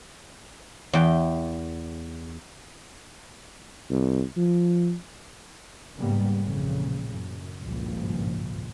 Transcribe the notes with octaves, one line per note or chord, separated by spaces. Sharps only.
E2 G5
C2
F3
G#2 C#3 G3 A#3 B3
A1 F2 A#2 C#3
F#2
G#1 C#2 G2 A#2 F3